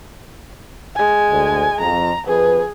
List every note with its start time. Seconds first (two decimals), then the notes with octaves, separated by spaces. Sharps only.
0.95 G#3 G#5
1.30 D2
1.80 F2 A#5
2.26 F2 G#4 B4